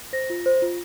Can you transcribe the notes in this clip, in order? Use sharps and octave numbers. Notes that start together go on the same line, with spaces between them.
C5 A#6
F4
C5
F4